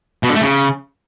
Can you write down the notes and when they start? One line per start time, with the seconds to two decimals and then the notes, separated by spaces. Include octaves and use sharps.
0.23 B2
0.29 D3
0.35 A3
0.42 C#3